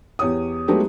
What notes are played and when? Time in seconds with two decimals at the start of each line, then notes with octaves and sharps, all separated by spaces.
0.19 E2 G4 C#5 D#6
0.68 F#3 G#3 A3 B3 D#4 G4